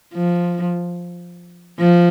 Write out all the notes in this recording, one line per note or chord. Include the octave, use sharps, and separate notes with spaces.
F3
F3